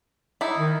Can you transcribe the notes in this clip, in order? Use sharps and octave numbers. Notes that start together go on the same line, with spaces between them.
D#4 E4
D#3